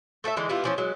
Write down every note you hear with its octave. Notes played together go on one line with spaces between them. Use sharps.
A3 A4 B4 E5
D3 E3 G#3 D#4
G3 B3 E4 F4
E3 F3 C#4
F#3 G#3